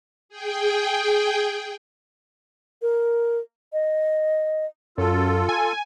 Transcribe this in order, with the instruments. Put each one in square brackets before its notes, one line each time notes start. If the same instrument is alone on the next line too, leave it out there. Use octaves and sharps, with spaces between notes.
[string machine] G#4 G5
[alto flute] A#4
D#5
[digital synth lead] F#2 [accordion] F4 A4
[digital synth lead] G#5